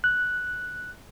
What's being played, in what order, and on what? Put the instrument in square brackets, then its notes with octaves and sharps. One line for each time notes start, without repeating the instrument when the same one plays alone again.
[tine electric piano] F#6